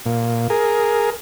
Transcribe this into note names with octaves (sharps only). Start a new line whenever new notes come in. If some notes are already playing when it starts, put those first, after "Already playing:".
A#2
G#4 A#4